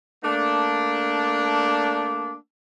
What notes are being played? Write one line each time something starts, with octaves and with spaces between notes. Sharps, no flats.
A3 A#3 D4